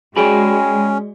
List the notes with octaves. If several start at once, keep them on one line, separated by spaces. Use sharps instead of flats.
G#3 C#4 F#4 G#4 D5 G5 G#5 B5